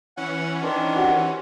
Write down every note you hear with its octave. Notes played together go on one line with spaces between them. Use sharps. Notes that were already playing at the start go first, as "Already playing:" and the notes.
E3 C#4 F#5
D#3 D4 C5 G#5
F#4 G4